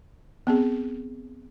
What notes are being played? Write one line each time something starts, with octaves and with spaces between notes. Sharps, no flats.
B3 C4 G#4